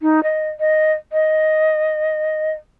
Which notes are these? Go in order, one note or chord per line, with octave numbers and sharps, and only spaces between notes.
D#4
D#5
D#5
D#5